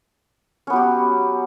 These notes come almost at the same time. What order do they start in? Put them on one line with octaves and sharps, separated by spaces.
C#4 B3 F#3 G4